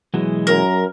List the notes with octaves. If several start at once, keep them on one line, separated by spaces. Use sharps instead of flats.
B2 E3 F#3 G#3
F#2 A#4